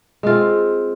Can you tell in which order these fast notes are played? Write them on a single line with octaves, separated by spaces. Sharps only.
G#3 F4 C4